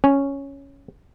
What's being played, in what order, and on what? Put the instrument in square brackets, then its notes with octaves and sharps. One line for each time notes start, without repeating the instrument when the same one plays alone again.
[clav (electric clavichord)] C#4